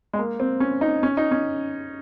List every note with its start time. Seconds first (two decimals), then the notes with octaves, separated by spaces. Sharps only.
0.13 G#3
0.19 A#3
0.40 C4
0.60 C#4
0.81 D#4
1.03 C#4
1.17 D#4
1.31 C#4